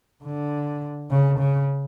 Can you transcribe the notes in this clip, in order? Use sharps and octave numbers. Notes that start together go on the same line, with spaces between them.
D3
C#3
C#3